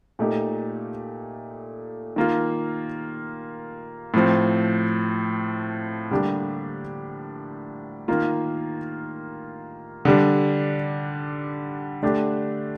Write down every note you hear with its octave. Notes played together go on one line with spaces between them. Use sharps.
A#2 A3 D#4 G4
D#3 A#3 F4
A2 F3 C4
D3 G3 A#3 D4 G4
D#3 A#3 F4
D3 G3 D4
D3 A3 D4 G4